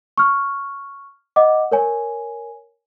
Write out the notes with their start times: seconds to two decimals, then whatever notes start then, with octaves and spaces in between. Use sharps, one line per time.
0.17 C#6 F6
1.36 D#5 F#5 D6
1.71 A#4 C#5 G#5